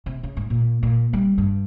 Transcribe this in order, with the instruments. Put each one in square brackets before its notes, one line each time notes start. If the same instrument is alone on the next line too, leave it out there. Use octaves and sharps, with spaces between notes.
[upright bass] C3
C#3
G#2
A#2
A#2
G3
G2